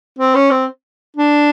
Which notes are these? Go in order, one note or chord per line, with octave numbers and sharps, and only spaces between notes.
C4
C#4
C4
D4